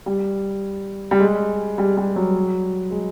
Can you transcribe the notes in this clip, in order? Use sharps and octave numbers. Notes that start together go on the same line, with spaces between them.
G3
G3
G#3
G3
G3
F#3
G#3